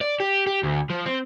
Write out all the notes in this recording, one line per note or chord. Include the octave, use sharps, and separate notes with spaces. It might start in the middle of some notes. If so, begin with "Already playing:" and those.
D5
G4
G4
D2
F3
C4